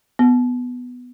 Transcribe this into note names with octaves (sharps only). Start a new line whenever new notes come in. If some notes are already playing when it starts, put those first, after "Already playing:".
B3